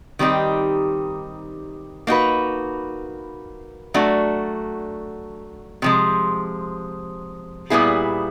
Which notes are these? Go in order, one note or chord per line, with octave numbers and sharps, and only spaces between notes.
D#3 G3 C4 D#4 G4
A#3 D#4 F#4 B4
F#3 A3 D4 F#4
C3 F3 G#3
A#2 G3 B3 E4 G#4